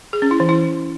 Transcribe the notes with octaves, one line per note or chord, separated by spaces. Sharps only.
G#4
C#4
E4
E3
E4